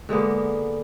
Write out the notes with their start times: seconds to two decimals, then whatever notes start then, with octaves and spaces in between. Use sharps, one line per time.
0.09 D3 G#3 A#3 B3